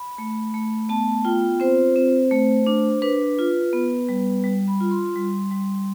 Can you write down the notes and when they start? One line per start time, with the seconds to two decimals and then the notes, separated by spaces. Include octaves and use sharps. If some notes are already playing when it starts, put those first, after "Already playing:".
Already playing: B5
0.18 A3
0.54 A3
0.89 B3 A5
1.25 F4 G5
1.60 C4 C5
1.96 C4
2.31 A3
2.67 D4
3.02 D4 B4
3.38 F4
3.73 B3
4.09 G3
4.44 G3
4.67 B5
4.80 F4
4.91 C6
5.16 G3
5.51 G3